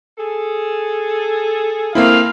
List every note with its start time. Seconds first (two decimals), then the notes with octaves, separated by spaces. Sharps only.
0.18 G#4 A4
1.95 A3 A#3 C4 E4 F4 G#4 F5